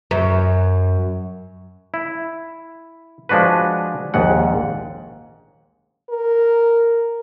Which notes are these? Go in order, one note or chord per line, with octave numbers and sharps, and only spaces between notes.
F#2
E4
F3 G#3 D4 F#4 B4
A#1 D#2 G#2 F#5
A#4